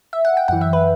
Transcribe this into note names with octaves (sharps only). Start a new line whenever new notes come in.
E5
F#5
G5
F#2 E3 F#5
E5
B4